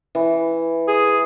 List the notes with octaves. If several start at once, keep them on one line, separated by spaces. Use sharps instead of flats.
E3
G#4